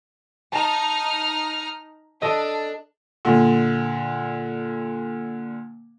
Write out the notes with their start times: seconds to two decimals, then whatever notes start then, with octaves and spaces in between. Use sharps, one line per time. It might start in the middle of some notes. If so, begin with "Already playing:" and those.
0.52 D#4 A5 A#5 F6
2.22 D4 A4 D#5
3.25 A#2 D3